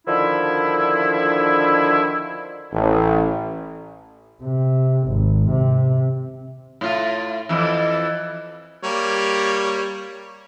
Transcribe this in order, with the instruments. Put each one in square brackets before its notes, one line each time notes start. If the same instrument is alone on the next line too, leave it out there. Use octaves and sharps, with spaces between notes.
[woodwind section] D3 D#3 F3 D4 E4
[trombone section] A1
[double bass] C3
G#1
C3
[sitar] A2 F4
F2 E3
[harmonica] G3 A#3 C#5